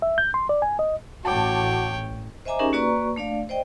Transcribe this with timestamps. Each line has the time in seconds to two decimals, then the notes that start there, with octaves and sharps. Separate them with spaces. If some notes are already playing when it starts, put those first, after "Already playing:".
0.02 E5
0.18 G6
0.34 C6
0.49 D5
0.62 G#5
0.79 D#5
1.25 A1 F#4 C#5 G5 A5 D6
2.45 C5 D#5 E5 G#5 A#5 D6
2.59 C#4 D#4 G4 G#4 A#4
2.73 A#3 F#4 B4 D5 A#5 C#6
3.16 A3 D4 D5 F5
3.49 C5 D5 D#5 G5